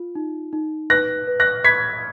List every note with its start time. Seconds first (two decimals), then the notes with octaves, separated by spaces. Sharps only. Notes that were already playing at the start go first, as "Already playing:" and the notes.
Already playing: F4
0.15 D#4
0.53 D#4
0.90 B4 F#6 A#6
1.27 B4
1.40 F#6 A#6
1.64 B5 G#6 B6